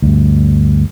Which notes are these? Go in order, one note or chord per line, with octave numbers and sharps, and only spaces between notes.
D2 G2